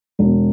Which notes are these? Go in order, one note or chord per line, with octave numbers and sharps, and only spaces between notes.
E1